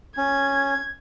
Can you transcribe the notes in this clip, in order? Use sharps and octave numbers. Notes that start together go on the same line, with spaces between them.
C#4 G#6